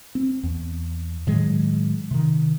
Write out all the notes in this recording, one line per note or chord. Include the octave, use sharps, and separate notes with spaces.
C4
E2
A2 D#3 F#3 G#3
C3 D#3